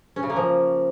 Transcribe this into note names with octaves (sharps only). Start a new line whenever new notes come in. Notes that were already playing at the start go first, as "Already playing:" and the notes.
C#4
C#3
A#3
F3